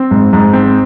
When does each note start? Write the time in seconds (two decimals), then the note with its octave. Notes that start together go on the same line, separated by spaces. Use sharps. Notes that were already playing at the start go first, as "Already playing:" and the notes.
Already playing: C4
0.11 G#2
0.33 G#2
0.53 C4